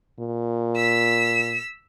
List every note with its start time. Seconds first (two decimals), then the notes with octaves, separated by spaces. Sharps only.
0.20 A#2
0.76 E6 B6